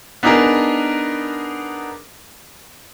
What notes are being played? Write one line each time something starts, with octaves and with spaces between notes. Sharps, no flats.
B3 D4 D#4 G#4 A#4